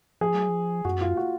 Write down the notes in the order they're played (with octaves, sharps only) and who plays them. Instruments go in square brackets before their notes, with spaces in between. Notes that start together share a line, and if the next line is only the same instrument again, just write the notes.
[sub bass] F3 [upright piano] G#4
[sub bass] F#3
F3
[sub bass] F#2 [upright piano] F#4
[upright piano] F4
F#4